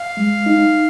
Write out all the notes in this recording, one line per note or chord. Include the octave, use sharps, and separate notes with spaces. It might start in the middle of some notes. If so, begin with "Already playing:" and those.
Already playing: F5
G#3
D#4